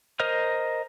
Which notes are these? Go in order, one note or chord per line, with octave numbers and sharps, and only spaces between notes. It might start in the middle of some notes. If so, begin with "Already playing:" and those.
A#4 C5 D#5 D#6 F6